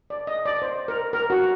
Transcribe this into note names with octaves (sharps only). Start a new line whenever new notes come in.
D5
D#5
D5
C5
A#4
A#4
F#4